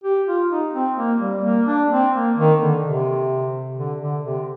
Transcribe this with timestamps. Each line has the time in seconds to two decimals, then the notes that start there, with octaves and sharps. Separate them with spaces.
0.03 G4
0.26 F4
0.50 D#4
0.73 C4
0.96 A#3
1.20 G3
1.44 A#3
1.67 D4
1.91 C4
2.14 A#3
2.37 D#3
2.60 D3
2.83 C3
3.77 D3
4.01 D3
4.24 C3